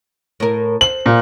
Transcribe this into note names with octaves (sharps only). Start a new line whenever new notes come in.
A2 A#4
C5 F#7
A#2